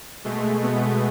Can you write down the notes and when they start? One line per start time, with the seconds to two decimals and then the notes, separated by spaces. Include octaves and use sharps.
0.24 B2 G#3 A3
0.63 B3